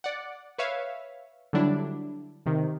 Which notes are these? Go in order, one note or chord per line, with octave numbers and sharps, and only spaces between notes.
D5 F#5
B4 C#5 E5 F5
D3 F#3 G3 D4 E4
C3 D#3